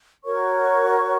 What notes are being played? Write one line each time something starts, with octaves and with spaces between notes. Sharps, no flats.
F#4 A#4 C#5 C#6